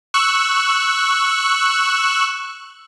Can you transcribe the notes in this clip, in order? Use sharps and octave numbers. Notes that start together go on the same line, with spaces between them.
C#6 E6 F#6